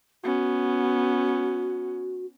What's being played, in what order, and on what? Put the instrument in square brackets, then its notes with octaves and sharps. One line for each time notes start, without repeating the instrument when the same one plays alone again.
[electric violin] B3 C#4 [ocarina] F#4